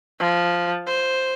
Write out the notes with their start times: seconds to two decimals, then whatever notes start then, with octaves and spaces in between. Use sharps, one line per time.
0.19 F3
0.87 C5